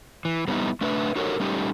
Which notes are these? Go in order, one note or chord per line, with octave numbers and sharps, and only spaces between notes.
E3
G3 A#3 B3 C#4 D#4 E4
A3 D4 B4 D#5 E5
D#4 F#4 G4 A4 A#4 C#5
G3 A3 C#4 D#4 G4